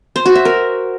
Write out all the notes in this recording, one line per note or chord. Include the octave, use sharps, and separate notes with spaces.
C5
F#4
E5
A#4